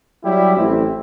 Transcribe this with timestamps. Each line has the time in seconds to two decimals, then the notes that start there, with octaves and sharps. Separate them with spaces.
0.24 F#3 G3 E4 G4
0.57 A1 A2 C4 E4